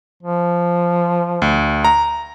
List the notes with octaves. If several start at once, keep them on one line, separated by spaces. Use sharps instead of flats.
F3
D2
A#5